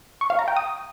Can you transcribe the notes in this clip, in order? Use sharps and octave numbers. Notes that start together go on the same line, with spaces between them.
C#6
F5
A#5
G5
D#6